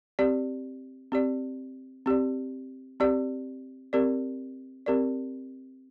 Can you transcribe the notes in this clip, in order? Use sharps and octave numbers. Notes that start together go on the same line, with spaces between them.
C4 G4 D5
C4 G4 D5
C4 G4 D5
C4 G4 D5
C4 G4 A#4 D5
C4 G4 A#4 D5